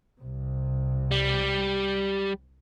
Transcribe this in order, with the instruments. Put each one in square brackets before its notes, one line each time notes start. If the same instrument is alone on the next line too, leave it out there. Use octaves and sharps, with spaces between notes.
[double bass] C2 C3
[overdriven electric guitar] G3